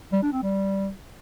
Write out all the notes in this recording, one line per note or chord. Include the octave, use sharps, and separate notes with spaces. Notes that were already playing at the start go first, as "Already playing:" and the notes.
G3
D4
C4
G3